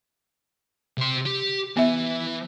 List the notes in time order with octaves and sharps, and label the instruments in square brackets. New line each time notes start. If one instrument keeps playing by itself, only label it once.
[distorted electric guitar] C3 C6
G4
[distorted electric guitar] E3 [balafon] B3 E5